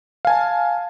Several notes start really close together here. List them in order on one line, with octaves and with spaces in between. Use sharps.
F5 G#5 A5